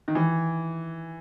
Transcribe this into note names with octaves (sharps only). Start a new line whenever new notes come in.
D#3
E3